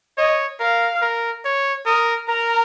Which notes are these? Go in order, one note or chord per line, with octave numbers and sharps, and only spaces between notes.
C#5 D#5
A#4 F5
A#4
C#5
A#4 D#6
A#4 A#5